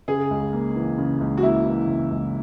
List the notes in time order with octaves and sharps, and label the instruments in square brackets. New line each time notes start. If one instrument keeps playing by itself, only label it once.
[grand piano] C#3 [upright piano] G#4
[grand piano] C#2
A#3
E3
C#3
C#2
[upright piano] F#4
[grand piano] A#3 [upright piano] E4
[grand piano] E3
C#3
C#2